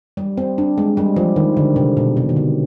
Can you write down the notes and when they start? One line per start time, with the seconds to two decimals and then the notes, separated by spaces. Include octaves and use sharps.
0.17 G3
0.38 C4
0.58 D4
0.78 G#3
0.97 G3
1.16 F3
1.36 D#3
1.57 D3
1.76 C3
1.97 B2
2.17 C3
2.29 D#3
2.36 D3